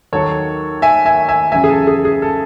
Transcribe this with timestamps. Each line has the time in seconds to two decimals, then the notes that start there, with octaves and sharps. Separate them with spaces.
0.13 D#2 D#3 F#3 A4 C#5
0.82 E5 G#5
1.06 E5 G#5
1.29 E5 G#5
1.52 E2 C#3 F#3 E5 G#5
1.64 G#4
1.70 A4
1.87 G#4
2.05 G#4
2.22 A4